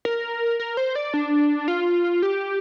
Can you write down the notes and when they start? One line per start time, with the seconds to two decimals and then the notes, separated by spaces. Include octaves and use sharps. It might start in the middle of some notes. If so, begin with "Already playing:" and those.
0.05 A#4
0.60 A#4
0.77 C5
0.95 D5
1.14 D4
1.68 F4
2.22 G4